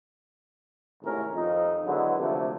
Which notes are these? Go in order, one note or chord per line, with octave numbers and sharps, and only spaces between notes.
G#1 D#2 A2 C3 C#4 A#4
F2 D#4
D3 D#3 F#3 G#3 B3 E4
D2 C3 F3 G3 A3 A#3